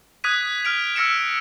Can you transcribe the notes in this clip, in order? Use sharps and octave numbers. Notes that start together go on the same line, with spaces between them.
D#6 F#6 G#6 B6 D#7
F6 D7 F7
E6 F6 A#6 C#7 D7 E7